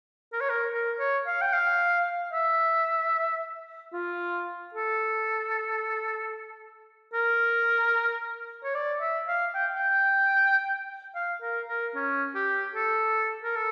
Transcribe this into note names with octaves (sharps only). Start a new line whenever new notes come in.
A#4
C#5
A#4
A#4
C#5
F5
G5
F5
E5
F4
A4
A#4
C#5
D5
E5
F5
G5
G5
F5
A#4
A#4
C#4
G4
A4
A#4
A4